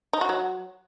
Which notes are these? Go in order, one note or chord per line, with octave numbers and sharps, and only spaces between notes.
D#4
F#4
F#3